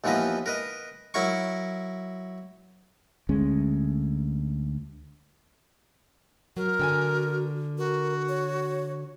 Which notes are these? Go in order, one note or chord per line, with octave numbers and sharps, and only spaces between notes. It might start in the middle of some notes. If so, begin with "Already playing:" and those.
D#2 E3 F3 B3 B4 D#5
A#4 B4 D#5
F#3 E4 A#4 C#6
D2 G#3 C#4
F#3 F#4 A#4
D3 G5 G#5
F#4 A#4
C#5